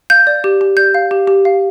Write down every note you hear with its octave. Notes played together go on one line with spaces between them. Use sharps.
F5 G6
D5
G4
G4
D5 G6
F5
G4
G4
F5